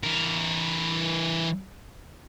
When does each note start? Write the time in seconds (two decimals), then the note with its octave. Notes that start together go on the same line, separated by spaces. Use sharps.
0.03 E3 A#4